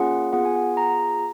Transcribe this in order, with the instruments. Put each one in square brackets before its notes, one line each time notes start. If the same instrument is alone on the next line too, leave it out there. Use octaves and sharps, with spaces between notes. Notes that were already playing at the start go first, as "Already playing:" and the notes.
Already playing: [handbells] A#3 C#4 F4 G#4 F#5
B3 F4 G#4 F#5
G#5
F#5
A#5